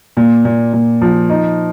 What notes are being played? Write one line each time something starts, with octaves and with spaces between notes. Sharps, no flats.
A#2
A#2
A#2
F3
D#4